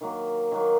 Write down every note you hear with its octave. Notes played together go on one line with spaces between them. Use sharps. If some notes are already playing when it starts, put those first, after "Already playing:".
D#3 F#3 A#3
D#3 F#3 A#3